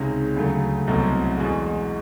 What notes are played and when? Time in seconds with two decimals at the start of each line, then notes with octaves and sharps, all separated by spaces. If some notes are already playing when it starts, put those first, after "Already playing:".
Already playing: C#2 C3 D#3 G#3 C#4
0.36 D2 C#3 F#3 A3
0.87 C2 B2 F#3 A3 C4
1.38 E2 B2 G#3